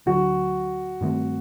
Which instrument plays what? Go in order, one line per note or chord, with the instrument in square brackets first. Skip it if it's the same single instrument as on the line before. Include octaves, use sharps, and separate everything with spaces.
[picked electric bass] D2 D3 F#3 [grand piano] F#4
[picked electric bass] G2 D#3 A3 C4